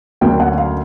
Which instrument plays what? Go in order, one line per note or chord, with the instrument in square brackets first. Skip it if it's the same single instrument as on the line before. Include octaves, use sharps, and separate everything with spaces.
[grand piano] D2 D3 F#3 A#3 C#4 G5
F#5
F5